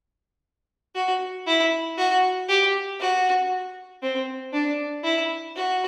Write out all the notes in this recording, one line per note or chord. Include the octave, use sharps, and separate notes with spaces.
F#4
E4
F#4
G4
F#4
C4
D4
E4
F#4